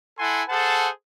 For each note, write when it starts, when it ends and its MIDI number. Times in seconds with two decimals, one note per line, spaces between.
0.19 0.42 64
0.19 0.42 69
0.19 0.42 78
0.19 0.42 80
0.19 0.42 84
0.49 0.89 68
0.49 0.89 69
0.49 0.89 72
0.49 0.89 78
0.49 0.89 81